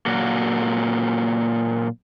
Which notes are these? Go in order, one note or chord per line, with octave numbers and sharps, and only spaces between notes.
A#2 F#3 A#3 F#4